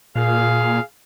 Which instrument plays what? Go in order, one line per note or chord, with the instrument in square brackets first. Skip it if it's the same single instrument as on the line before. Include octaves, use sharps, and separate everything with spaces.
[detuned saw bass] A#2 [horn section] G#4 F5